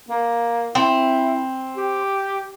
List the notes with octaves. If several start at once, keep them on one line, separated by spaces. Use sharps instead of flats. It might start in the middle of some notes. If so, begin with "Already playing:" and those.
A#3
C4 E4
G4